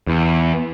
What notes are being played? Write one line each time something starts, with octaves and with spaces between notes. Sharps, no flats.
E2